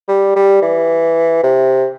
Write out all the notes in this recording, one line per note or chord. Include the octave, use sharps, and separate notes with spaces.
G3
G3
E3
C3